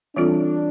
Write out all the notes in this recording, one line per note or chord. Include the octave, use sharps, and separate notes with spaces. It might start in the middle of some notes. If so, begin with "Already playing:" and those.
E3 G3 C4 D4 F4 A4